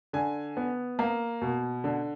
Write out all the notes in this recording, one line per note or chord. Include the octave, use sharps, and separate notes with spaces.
D3 G#5
B3
A#3
B2
D3